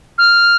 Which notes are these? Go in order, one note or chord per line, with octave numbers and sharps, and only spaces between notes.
F6